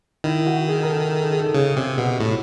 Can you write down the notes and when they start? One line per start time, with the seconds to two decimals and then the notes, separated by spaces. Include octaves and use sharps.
0.24 D#3 E4
0.46 F#4
0.68 G#4
0.83 A#4
0.89 A4
1.22 A4
1.31 G#4
1.39 A4
1.54 C#3 G#4
1.76 C3 G4
1.98 B2 F#4
2.20 A2